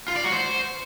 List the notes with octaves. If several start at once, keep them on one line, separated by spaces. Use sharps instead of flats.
F4
D5
F#4
C5